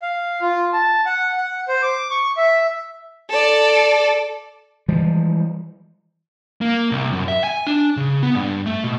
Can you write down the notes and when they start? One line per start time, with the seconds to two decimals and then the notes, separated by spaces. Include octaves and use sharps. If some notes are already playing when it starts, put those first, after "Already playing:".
0.02 F5
0.42 F4
0.73 A5
1.06 F#5
1.37 F#5
1.68 C5
1.82 D6
2.11 C#6
2.37 E5
3.30 A4 D5
4.88 E3 F3 G3 G#3
6.61 A#3
6.91 C2
7.12 F#2
7.28 E5
7.44 G#5
7.67 D4
7.97 C#3
8.23 B3
8.35 G2
8.66 A3
8.84 B2